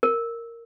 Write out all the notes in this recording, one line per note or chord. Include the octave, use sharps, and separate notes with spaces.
A#4